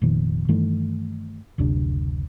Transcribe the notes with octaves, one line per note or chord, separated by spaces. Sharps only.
F1 A#2 D#3 F3
G2 D#3 E3 A3
F#1 D2 C3 D4